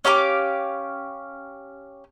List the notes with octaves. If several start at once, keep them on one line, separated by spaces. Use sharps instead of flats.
C#4 G4 F5 D6